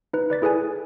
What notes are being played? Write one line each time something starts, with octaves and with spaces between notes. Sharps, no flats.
D#4 B4
B4 D5 A6 B6
E4 G#4 A4 B4 G#5